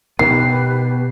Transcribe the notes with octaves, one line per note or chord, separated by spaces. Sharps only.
B2 D#3 B3 G4 B4 C7